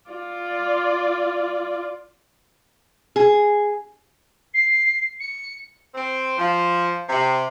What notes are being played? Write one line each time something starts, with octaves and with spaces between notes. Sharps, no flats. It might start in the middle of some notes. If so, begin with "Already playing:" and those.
F4 D5
G#4
C7
C#7
C4
F3
C3